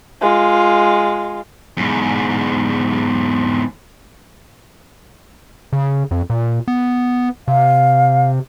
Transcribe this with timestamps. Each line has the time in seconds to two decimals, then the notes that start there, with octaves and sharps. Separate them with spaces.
0.22 G#3 F4
1.77 E2 G#2
5.73 C#3
6.11 F2
6.30 A#2
6.68 B3
7.48 C3 F5